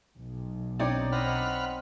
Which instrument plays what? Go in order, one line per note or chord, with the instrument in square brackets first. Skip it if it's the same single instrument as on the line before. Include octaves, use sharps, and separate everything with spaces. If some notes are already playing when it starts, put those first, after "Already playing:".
[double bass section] B1
[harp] C4 C#5 G5 [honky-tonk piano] D4 D#4 D5
[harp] C5 D#5 [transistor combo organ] F#5 B5 F6